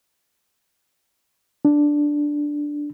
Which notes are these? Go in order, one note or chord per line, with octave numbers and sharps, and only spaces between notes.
D4